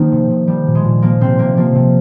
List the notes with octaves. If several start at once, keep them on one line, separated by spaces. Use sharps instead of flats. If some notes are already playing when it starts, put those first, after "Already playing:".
Already playing: D#3 F3 A#3 D#4
C3
C3
F3 G3
A#2
G#3
A#2
F3 A#3
C3 C4
C3 A#3
F3 A#3
C3